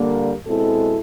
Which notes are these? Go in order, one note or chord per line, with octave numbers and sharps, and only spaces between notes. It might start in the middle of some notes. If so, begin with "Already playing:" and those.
Already playing: D3 G3 A#3
B2 G#3 C4 E4 A4